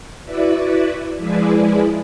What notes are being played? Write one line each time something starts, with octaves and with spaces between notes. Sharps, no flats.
E4 F#4 B4 D5 E5
F3 G#3 E4 G#4 B4 D5